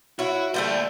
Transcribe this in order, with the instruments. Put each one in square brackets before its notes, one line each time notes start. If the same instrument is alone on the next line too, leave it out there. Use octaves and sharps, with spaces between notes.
[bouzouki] E4 C#5 [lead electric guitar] F#4
[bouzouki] D3 G3 A3 [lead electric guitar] A#3 C5